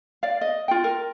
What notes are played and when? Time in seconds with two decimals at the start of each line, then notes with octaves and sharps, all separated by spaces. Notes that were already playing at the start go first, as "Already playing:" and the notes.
0.23 D5 F5
0.41 D#5
0.68 F4 G5
0.84 A#4